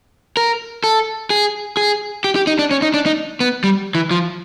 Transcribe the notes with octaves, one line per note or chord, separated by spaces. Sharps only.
A#4
A4
G#4
G#4
G4
G4
D#4
D4
C#4
D#4
D4
D#4
B3
G3
E3
F3